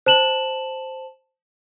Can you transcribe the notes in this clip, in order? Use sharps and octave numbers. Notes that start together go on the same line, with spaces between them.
C5 A5 E7 F#7